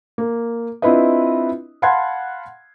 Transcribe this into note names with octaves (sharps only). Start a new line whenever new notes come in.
A#3
C4 D4 E4 F4 B4 D#5
F5 F#5 A5 B5 C6 G#6